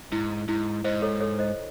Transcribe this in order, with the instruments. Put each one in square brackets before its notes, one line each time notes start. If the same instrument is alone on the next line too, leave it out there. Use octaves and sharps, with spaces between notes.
[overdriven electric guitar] G#2 [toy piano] E4
[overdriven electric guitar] G#2 [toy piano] E4
[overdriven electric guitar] G#2 [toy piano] C5 D#5
[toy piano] A4 C#5
A4 C#5
C5 D#5